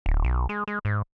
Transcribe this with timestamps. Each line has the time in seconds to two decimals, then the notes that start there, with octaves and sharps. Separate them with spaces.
0.06 D1
0.24 B1
0.49 G#3
0.68 G#3
0.85 G#2